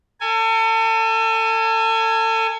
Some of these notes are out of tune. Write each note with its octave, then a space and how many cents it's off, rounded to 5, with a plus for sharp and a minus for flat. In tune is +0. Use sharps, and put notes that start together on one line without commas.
A4 +35 G#5 +0